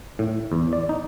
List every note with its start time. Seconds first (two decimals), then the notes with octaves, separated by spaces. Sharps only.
0.19 A2
0.52 E2
0.73 D5
0.89 D#4